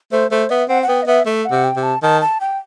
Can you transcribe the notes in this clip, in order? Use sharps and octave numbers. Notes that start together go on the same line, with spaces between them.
A3 C5
A3 C5
B3 E5
C4 F#5
F#5
B3 G5
D#5
B3 E5
A3 E5
F#5
C3
G5
C3
A5
D#3 A5
A5
G5